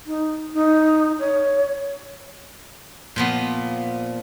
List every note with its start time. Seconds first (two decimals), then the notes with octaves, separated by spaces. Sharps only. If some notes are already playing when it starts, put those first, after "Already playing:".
0.06 D#4
0.53 D#4
1.19 C#5
3.16 A#2 F3 B3